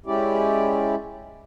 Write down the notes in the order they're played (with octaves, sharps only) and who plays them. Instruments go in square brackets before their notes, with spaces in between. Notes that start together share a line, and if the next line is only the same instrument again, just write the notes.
[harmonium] G#3 C#4 E4 G4 D5